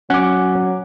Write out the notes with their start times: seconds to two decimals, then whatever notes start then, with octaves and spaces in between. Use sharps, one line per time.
0.10 F#3 C#4 F#5 D6